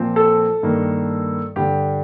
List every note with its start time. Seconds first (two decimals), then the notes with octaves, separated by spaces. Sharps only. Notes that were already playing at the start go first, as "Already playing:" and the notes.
Already playing: A#2 F3 C4
0.16 A4
0.63 G2 D#3 A#3
1.56 G2 D3 G3 G4